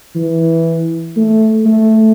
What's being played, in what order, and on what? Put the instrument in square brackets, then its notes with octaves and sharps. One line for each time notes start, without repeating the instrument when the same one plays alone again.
[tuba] E3
A3
A3